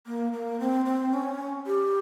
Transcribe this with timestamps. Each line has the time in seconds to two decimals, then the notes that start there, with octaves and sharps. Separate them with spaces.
0.06 A#3
0.33 A#3
0.60 C4
0.85 C4
1.13 C#4
1.66 G4